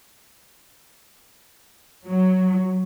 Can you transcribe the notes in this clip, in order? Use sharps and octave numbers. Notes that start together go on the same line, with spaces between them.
F#3